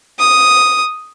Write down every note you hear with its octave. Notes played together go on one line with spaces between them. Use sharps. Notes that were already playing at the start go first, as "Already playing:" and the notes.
D#6